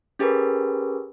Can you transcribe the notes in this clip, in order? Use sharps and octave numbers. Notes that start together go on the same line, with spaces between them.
C#4 G4 G#4 A#4 B4